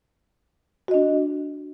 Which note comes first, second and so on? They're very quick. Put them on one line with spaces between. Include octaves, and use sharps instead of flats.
F#4 D#5 D4